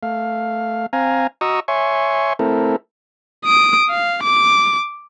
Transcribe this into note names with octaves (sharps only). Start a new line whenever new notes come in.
A3 F5
C4 F5 G#5 A#5
F#4 D#5 A#5 C#6 D#6 E6
C#5 E5 G#5 C6 C#6
A3 C4 E4 A4 A#4
D#6 D7
F5
D6